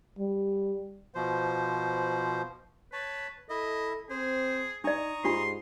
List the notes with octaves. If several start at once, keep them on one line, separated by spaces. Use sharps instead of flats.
G3
B2 F3 C5
B4 C#5 A5
E4 A4 D#5 E5
C4 G#4 C5
D4 D#4 D5 A#5 C#6 D#6
G#2 D4 F4 G4 C6